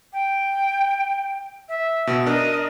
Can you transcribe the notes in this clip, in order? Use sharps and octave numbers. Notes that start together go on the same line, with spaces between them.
G5
E5
B2
D4 A#4 D#5